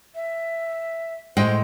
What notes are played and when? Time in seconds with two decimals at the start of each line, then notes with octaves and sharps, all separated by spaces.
0.15 E5
1.37 A2 G#3 C5 G5